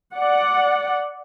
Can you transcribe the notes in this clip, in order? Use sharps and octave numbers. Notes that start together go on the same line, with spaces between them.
D5 F#5